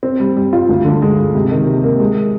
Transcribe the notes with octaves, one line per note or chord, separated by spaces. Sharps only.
C4
G3
G3
F4
D2
D3
G#3
G#3
C3
D#3
C3
A#3
G#3